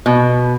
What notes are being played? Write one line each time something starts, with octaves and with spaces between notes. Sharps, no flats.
B2